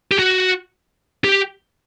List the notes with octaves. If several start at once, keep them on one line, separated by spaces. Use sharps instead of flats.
G4
F#4
G4